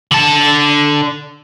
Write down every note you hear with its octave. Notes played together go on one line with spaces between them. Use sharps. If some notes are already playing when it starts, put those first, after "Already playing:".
D3 A5